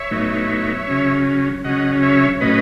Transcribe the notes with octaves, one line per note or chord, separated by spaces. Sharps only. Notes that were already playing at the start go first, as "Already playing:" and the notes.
Already playing: C#5 E5
A2 F#3 B3 D#4
C#3 F#3 C#4
C#3 F#3 C#4 D#5 F#5
C#5 E5
A2 F#3 C#4 B4 D#5